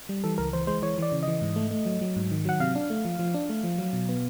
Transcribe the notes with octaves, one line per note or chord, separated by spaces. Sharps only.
G3
E3 A4
C#2 A#4
E3 C5
G#3 C5
E3 C#5
E3 D5
C#3
E3 D#5
G#2
A3
A3
F#3
F#3
G#2
D#3
F#3 F#5
C3 F5
D4
A3
F3
F3
D4
A3
F3
F#3
B2
B3